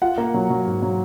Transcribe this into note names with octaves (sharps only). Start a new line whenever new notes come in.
F4 F#5
A#3
F#3
F#3
G#2
F#3